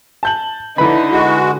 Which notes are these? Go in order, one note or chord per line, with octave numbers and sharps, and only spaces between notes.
A5 G6 F#7
D3 D#4 E4 B4 B5
G#3 F#4